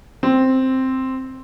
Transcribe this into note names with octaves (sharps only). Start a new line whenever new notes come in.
C4